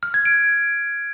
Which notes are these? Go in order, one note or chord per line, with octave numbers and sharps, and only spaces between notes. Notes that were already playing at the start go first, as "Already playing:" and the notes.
F6
G#6
D7